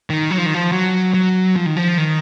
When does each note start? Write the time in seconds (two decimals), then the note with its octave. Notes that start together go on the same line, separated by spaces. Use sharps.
0.10 D#3
0.31 F#3
0.38 F3
0.46 D#3
0.54 F3
0.72 F#3
1.14 F#3
1.56 F3
1.66 D#3
1.76 F3
1.98 D#3